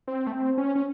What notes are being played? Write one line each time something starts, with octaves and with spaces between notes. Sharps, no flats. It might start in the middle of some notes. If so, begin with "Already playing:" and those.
C4
A3
C4
C#4
C#4